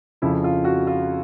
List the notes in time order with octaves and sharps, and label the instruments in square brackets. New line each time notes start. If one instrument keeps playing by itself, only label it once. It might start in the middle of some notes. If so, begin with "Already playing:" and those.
[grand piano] F2 C#3 F3 E4
F4
F#4
F4